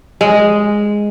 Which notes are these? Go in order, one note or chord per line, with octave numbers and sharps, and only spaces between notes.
G#3